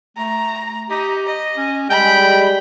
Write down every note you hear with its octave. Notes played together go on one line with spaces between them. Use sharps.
A3 A#5
D#4 G4
D#5
C#4
G3 G#3 G5 B5